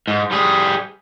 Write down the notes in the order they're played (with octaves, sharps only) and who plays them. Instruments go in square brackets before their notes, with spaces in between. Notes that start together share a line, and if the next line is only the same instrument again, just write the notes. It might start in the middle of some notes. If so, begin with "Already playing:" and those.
[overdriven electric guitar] G#2
G3 G#4